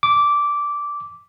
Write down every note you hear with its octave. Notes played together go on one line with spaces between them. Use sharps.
D6